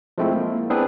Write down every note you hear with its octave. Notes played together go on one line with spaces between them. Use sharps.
F3 G#3 A3 C4 E4
A#3
B3 C4 D4 E4 G#4 B4